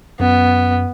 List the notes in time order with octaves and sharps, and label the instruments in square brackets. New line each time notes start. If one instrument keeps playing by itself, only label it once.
[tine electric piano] F#2 [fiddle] B3